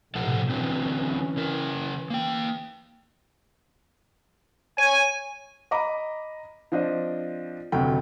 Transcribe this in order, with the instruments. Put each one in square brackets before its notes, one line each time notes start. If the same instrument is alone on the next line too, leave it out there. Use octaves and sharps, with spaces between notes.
[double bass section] B1 A2 C3 [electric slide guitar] F3 A4 F#5
[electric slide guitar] D3 F#3 C4 [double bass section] E3 C#4
[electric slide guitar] C#3 A#4
A#3 G5
[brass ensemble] C#5 G#5 [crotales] D#7
[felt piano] D#5 A#5 B5 D6
F3 C4 D4 D#5
F1 D2 C3 F#3 G5